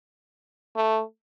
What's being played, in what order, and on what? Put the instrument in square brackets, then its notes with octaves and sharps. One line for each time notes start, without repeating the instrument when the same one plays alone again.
[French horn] A3